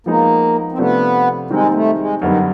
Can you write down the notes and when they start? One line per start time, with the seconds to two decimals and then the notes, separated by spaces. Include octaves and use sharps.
0.06 F3 G#3 A#3 B3 D#4
0.72 C4
0.78 C3 F3 A3 B3 D4
1.50 D#3 G3 G#3 C4 D#4
1.69 A#3
1.74 A3
1.98 G#3
2.21 F#2 D3 D#3 G3 B3